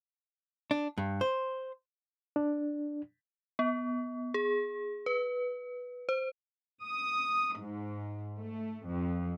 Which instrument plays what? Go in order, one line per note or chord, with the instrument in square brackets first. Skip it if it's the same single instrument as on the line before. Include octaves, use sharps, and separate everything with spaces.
[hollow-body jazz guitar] D4
G2
C5
[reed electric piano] D4
[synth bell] B3
G#4
B4
C5
[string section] D#6
G#2
A3
F2